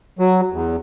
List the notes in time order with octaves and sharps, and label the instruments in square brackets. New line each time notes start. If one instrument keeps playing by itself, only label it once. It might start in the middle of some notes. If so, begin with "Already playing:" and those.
[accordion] F#3
E2